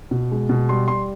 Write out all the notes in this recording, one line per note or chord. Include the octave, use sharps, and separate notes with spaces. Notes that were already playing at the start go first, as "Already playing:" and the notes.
B2
G#3
B2
G3 C6
G3 C6